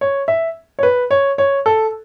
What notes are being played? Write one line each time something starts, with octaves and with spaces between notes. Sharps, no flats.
C#5
E5
C#5
B4
C#5
C#5
A4